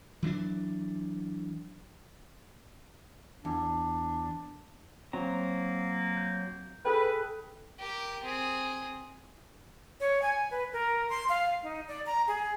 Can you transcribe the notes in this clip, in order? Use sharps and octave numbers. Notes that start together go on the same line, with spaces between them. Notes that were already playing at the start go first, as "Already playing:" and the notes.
E3 F#3 B3 D4
E2 D4
F#3 A#3 C4 A#5
G6
G#4 A4 B4 G5
G4 A#4
C4 G#4
C#5
G#5
B4
A#4
C6
F5
D#4
D5
A#5
G#4